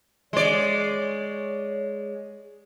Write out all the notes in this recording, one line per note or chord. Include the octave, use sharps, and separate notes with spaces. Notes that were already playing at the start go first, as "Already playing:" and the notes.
G#3 C#5 D5